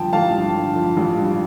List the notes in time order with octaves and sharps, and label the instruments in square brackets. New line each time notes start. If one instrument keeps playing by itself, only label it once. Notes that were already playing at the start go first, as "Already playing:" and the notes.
Already playing: [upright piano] G2 D3 F3 G5 A5
A1 F5 A5
G2
D3
F3
A1
G2